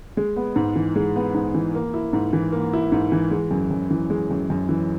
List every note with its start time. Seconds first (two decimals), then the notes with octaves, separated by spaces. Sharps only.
0.17 G#3
0.36 B3
0.56 G#2
0.76 E3
0.96 G#3
1.16 B3
1.34 G#2
1.55 E3
1.75 A#3
1.94 E4
2.13 G#2
2.33 E3
2.52 A#3
2.73 E4
2.92 G#2
3.12 E3
3.31 G#3
3.51 F#2
3.71 F#2
3.91 E3
4.10 G#3
4.31 F#2
4.50 F#2
4.69 E3